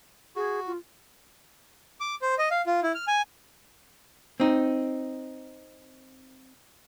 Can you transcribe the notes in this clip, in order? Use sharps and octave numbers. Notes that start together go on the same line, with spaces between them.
F#4 G#4
F4
D6
C5
D#5
F5
F4
E4
F6
G#5
C4 D#4